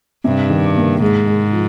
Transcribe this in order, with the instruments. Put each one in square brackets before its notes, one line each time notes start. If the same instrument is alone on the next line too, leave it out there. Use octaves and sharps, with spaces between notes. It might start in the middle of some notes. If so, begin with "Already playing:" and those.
[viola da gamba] G2 [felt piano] C3
[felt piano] D#3
A#3
[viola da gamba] G#2 [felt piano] G#3
[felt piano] G#3
F3